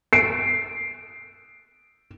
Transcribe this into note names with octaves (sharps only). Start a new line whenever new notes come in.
C7 D7